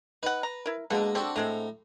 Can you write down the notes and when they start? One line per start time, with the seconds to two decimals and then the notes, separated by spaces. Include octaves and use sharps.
0.23 D#4 B4 F#5
0.43 A#5
0.66 E4 A#4
0.90 B2 D3 G#3 A#3
1.15 D3 C4 D4 F#4 G4 A4
1.36 A2 D3 G#3 C4 A#5